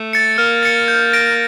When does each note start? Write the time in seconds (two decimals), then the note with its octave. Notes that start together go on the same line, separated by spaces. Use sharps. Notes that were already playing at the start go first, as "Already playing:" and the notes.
Already playing: A3
0.13 A6 C#7
0.38 A#3 F6
0.63 A6 C#7
0.88 G6
1.13 A#6 D7